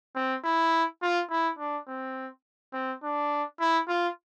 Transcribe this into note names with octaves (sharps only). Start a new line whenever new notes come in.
C4
E4
F4
E4
D4
C4
C4
D4
E4
F4